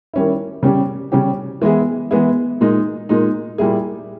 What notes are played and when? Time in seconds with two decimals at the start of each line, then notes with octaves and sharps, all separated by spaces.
0.14 D#3 G3 C#4 E4
0.63 C#3 G3 C#4 G4
1.12 C#3 G3 C#4 G4
1.62 E3 G#3 B3 E4 G#4
2.11 E3 G#3 B3 E4 G#4
2.61 A#2 G#3 D#4
3.09 A#2 G#3 D#4
3.58 A#2 G3 A#3 E4 G#4